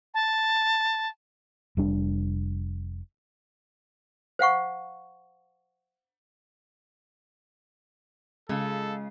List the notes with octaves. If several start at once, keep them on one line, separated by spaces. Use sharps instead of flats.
A5
F1 G3 D4
C5 F5 F#5 C#6
C#3 G#3 F4 A4